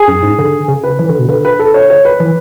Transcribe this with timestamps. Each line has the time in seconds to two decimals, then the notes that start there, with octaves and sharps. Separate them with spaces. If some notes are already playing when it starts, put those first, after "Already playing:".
Already playing: G#4
0.08 F#2
0.23 G#2
0.39 D3
0.68 C#3
0.83 B4
0.99 E3
1.09 D3
1.19 B2
1.29 D3 B4
1.45 B4
1.59 A4
1.74 C#5
1.90 C#5
2.05 B4
2.20 E3